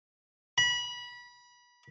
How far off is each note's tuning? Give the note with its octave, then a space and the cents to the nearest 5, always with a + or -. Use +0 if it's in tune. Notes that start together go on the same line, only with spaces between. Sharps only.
B5 -25